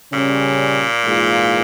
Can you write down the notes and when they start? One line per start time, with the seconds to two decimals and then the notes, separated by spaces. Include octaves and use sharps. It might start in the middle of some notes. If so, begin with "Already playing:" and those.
0.12 A#2 C#3 G3 C#4
1.04 G#2 E3 A#3 F4 G#4